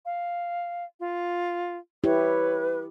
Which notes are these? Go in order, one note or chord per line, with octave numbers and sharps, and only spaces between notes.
F5
F4
E4 G4 B4 C#5